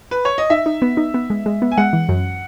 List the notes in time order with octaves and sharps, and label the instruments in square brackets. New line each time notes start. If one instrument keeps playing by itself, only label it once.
[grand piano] B4
C#5
D#5
[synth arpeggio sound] D#4 [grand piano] E5
[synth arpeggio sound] D#4
B3
D#4
B3
G#3
G#3
B3
[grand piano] G#5
[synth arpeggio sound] G#3 [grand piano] F#5
[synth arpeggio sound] E3
F#2